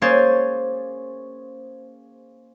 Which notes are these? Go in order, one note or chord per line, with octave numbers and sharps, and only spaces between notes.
A#3 C#4 G#4 C5 C#5 A6